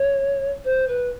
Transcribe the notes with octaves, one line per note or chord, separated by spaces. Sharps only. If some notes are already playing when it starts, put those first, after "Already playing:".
Already playing: C#5
C5
B4